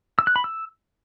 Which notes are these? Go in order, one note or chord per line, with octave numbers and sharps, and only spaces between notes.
E6
F#6
B5
E6